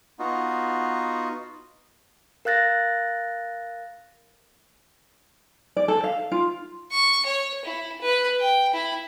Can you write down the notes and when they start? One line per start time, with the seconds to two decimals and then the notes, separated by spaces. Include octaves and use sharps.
0.19 B3 D#4 F4 F#4
2.45 A#4 F5 F#6 A6 A#6
5.77 D5
5.88 A4
6.04 F5
6.31 F4
6.91 C#6
7.26 C#5
7.65 E4
8.01 B4
8.39 G5
8.73 E4